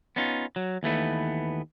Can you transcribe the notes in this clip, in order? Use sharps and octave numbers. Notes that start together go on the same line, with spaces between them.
B3 C#4 D#4 F4
F#3
D#2 E3 A3 B3